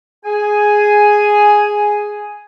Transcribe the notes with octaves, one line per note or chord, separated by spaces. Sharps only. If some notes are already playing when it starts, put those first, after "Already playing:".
G#4 G#5